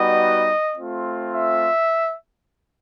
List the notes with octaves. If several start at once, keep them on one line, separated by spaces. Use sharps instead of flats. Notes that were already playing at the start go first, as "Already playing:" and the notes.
Already playing: G3 B3 D#4 F#4 D#5
A3 C4 F4
E5